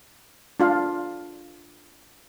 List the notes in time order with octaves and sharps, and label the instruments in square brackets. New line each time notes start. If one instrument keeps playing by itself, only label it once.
[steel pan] D4 F4 F5